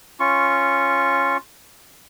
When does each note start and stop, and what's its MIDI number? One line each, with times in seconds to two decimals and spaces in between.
0.20 1.37 61
0.20 1.37 65
0.20 1.37 85